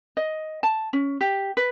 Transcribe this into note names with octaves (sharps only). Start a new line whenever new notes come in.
D#5
A5
C#4
G4
B4